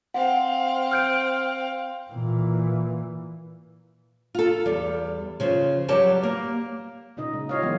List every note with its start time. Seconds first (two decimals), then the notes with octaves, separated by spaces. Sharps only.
0.14 C4 F5 F#5
0.92 F6 G6 D7
2.11 A#2 E3
4.35 F4 A4
4.66 E2 G3
5.40 C#3 F3
5.88 F#3 G3 G4 B4 A5
6.23 A#3
7.17 A#2 C#3 D#4 D#5
7.34 G#3
7.49 E4 F4 G4 C#5 D#5 F5
7.62 E3 F#3 G#3 A#3 B3